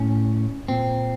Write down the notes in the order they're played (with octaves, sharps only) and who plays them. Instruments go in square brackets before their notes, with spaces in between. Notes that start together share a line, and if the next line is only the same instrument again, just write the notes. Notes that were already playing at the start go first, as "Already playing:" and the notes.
Already playing: [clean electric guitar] A2 C#4
A#2 C4